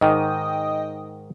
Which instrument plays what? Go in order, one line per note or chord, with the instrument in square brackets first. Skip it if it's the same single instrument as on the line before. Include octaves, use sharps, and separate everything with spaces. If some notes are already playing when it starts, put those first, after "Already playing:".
[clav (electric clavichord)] G#2 D#3 [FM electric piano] D#5 G5 D#6